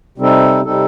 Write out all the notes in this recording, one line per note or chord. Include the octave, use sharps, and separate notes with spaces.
C3 G3 C4 D#4 A4
C3 G3 C4 D#4 A4